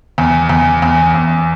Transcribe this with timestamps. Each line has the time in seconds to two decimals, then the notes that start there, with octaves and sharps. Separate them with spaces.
0.18 E2
0.49 E2
0.82 E2
1.15 E2